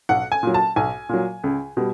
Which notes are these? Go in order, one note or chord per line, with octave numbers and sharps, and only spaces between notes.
B1 F#5
G#5
A#2 F#3
A5
B1 G#5
A#2 F#3
C#2
B2 G3